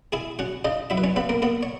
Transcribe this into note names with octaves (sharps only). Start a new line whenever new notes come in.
E4 G#4 G#5
C#4 F#4 F#5
C#3 D#4 D#5
F#3 E4 E5
B4
C#4 C#5
C#3 B3 B4
A#3 A#4
A#3 B3 A#4
C#5